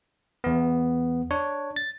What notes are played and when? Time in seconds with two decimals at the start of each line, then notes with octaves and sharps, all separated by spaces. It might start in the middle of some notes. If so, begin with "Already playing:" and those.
0.44 E2 B3
1.31 D4 C#5
1.76 A6